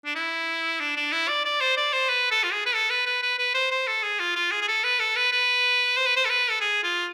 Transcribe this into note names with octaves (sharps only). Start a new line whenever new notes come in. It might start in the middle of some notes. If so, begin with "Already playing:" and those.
D4
E4
D4
D4
E4
D5
D5
C5
D5
C5
B4
A4
F4
G#4
B4
A4
B4
B4
B4
B4
C5
C5
A4
G#4
F4
F4
G#4
G#4
A4
B4
A4
B4
B4
C5
B4
C5
A4
B4
A4
G#4
F4